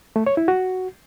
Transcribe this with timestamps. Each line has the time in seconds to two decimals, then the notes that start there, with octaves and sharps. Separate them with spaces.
0.16 A3
0.26 C#5
0.37 E4
0.48 F#4